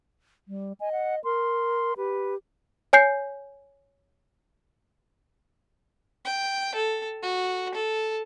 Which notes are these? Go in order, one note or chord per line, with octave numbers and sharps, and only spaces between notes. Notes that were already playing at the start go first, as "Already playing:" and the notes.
G3
D#5 G#5
F#5
A#4 C6
G4 B4
C#5 G#5 G6 C7
G5
A4
F#4
A4